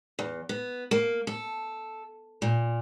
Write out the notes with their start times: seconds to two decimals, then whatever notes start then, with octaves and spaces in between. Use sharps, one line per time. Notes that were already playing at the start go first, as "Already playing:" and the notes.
0.19 E2
0.49 B3
0.91 A#3
1.27 A4
2.42 A#2